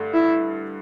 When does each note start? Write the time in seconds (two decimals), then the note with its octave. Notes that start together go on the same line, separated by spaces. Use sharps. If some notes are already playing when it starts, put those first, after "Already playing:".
Already playing: G2 D3 A3
0.14 E4